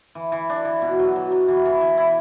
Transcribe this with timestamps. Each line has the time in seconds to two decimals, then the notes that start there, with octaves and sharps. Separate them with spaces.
0.15 E3
0.32 E3
0.49 D4
0.65 E3
0.82 B2
0.99 F#3
1.16 F#3
1.32 F#3
1.48 E3
1.65 E3
1.81 E3
1.97 E4